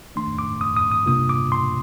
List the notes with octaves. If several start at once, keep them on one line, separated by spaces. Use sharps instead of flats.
D#3 A3 D4 C6
D6
D#6
D#6
D#6
C3 G3 A#3 D4 F4 D#6
D6
C6